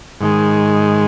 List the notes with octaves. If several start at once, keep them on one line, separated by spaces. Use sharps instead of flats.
G#2 D#3 G#3